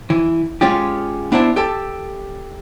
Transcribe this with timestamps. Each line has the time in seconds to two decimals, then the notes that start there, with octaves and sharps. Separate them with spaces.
0.10 E3
0.61 G#3 C#4 F4 G4
1.32 B3 D4 E4 C5 A5
1.56 G4 A4 A5